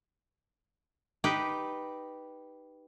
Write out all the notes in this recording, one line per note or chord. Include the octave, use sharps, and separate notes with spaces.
D#4 G4 B4